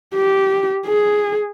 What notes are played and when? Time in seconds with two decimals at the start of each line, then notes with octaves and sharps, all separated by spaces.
0.15 G4
0.87 G#4